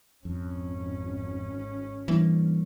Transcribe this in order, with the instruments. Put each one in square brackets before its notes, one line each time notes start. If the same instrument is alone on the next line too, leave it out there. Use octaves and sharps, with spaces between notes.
[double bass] G#1 C#4 [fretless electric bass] F2
[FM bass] E3 [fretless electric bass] G3 A#3 D4